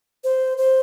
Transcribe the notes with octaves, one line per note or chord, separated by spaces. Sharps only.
C5
C5